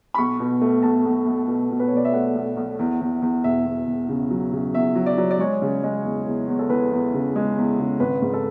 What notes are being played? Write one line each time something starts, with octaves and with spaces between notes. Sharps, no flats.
B5
B1 C#6
B2
A3
B1 A5
B1
B1
B2
B2
B4
C#5
B1
D5
E5
A3 F#5
B1
B1
E2
E2
E2
E1 E5
E2
E1
C#3
F#3
C#3
E2 E5
F#3
D5
F#3
D5
G#3 C#5
C#3
G#3
E2
E2
E2
A4
E2 B4
E2
C#3
G#3
E2
C#3
G#1 B4
G#2
A4